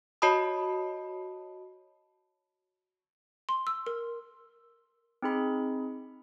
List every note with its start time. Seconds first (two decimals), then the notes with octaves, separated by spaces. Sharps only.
0.22 F#4 C#5 D#5 A5 B5 D#6
3.49 C6
3.67 E6
3.87 A#4
5.22 C4 D#4 G#4 B5